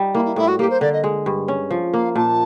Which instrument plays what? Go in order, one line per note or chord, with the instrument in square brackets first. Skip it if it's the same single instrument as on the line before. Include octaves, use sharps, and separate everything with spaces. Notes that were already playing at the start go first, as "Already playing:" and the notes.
Already playing: [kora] G3 D#4
[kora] A#3 [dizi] E4
[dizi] E4
[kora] A2 [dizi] E4
[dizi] F#4
[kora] A#3 [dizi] G4
[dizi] C5
[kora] D3 [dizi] D5
[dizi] D#5
[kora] G#3
G2
C#4
F3
[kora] A#3 [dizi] F5
[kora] A#2 [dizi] A5